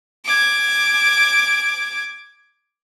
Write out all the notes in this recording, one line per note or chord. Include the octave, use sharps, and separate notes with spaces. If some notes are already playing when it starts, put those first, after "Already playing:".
D6 G#6